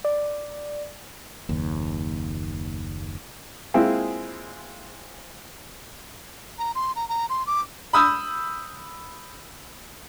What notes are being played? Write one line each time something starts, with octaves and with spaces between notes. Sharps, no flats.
D5
F#1 D#2
G#3 A#3 C4 E4 F4 G#4
A#5
C6
A#5
A#5
C6
D6
B5 D#6 E6 G6